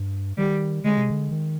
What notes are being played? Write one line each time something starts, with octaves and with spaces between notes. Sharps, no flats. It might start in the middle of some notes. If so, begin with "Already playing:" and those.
Already playing: G2
D#3 G3
D3 G#3
C3
D3
D#3